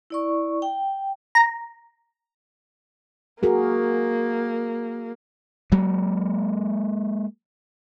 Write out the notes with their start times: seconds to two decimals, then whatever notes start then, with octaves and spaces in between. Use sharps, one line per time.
0.10 E4 D5 C#6
0.62 G5
1.35 A#5
3.43 A#3 F#4 G#4 A#4
5.72 F#3 G#3 A#3